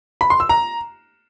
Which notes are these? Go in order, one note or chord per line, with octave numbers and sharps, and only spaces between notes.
B5
C6
E6
A#5